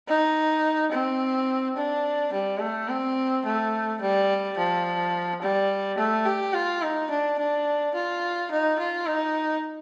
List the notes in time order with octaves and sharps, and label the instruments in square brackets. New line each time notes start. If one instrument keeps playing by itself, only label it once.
[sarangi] D#4
C4
D4
G3
A3
C4
A3
G3
F3
G3
A3
G4
F4
D#4
D4
D4
F4
D#4
F4
D#4